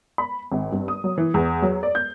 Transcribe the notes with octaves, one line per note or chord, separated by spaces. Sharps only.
B5
G#1
G2
D#6
F#3
E3
E2
F#3
D5
G6